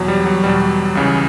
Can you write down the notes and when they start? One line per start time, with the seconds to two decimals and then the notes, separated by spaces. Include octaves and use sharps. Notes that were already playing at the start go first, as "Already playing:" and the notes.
Already playing: E2 B2 F#3
0.08 G3
0.26 F#3
0.43 E2 B2 G3
0.95 C#2 C#3 E3